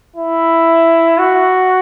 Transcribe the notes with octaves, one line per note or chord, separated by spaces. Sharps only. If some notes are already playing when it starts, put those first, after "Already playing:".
E4
F#4